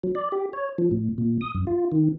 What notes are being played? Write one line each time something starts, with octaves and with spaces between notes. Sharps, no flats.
F#3
D5
G4
C#5
F3
A2
A#2
D#6
F#2
F4
D#3